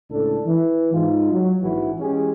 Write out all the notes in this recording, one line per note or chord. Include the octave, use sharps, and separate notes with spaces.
C#2 A2 D4 A4
E3
G#2 D#4 F4
F#3
A#1 G#2 E3 E4 F#4
E3 G#3 C#4 G4 G#4